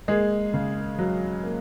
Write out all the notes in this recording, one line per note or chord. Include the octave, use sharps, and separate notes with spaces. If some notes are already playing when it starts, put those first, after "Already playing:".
G#3 A#3 G#4
C#3
F#3
A#3